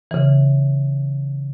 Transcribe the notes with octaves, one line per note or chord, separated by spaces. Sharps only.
C#3 E3